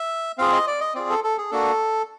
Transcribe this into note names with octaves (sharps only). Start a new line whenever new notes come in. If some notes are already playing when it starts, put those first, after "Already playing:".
Already playing: E5
C4 F4 G#4 F5
D#5
D5
D#5
C4 F4 G#4 D5
A4
A4
G#4
A#3 D4 F#4 A4